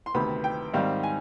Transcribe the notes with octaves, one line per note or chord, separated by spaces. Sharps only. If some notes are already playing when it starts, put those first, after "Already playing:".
C6
D2 C3 D#3 B3 B5
G5
G#2 D#3 G3 C4 F5
G#5